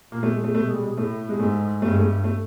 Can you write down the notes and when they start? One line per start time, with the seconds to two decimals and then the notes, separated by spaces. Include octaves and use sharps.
0.12 A#2 A#3
0.23 A3
0.33 G#3
0.44 A3
0.55 B2 A3
0.65 G#3
0.73 G3
0.83 G#3
0.97 A2 A3
1.29 G#3
1.39 G#2 A3
1.82 G2 A3
1.91 G#3
2.00 A3
2.24 A3